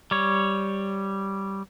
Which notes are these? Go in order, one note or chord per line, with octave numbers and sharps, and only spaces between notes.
G3 C#5